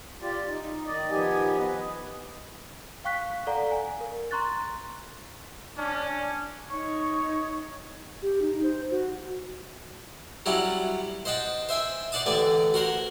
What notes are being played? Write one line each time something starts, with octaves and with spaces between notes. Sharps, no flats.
F4 G4 D5
D#4
D#3 D5 D#5
D#3 F3 B3 G4 G#5
B4 D#5
F5 G5 C#6 F#6 B6
A4 D5 F5 F#5 A#5
G#5
A#4
A#5 C6 C#6 F#6 A6
C#4 D4
D#4 C#5 C#6
G4
D#4
C5
F#4
F#3 G3 C#4 E4 F#5
C5 D#5 F#5 G5 A5
C5 E5 G5 G#5
C5 D5 F#5 A5 D#6
A1 D3 D5 G#5
F#4 A#4 C5 C#5